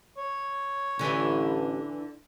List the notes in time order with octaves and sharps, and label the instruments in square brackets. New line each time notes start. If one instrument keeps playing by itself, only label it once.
[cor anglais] C#5
[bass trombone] A1 [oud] D3 E3